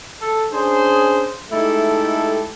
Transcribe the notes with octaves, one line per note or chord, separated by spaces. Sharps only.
A4
C#4 D4 G#4 C5
G#3 A3 D#4 E4 G4 A4